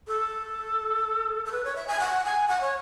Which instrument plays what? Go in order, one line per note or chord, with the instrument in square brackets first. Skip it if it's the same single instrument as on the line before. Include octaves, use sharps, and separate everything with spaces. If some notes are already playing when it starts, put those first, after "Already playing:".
[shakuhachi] A4
A4
B4
C#5
E5
G#5
F#5
G#5
F#5
C#5